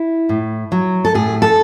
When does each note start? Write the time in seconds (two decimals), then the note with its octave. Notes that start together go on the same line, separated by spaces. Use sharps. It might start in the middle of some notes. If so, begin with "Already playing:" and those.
Already playing: E4
0.29 A2
0.72 F#3
1.05 A4
1.14 A2 G#4
1.42 A4